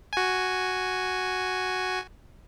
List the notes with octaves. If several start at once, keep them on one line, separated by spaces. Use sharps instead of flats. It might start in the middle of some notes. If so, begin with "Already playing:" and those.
F#4 G#5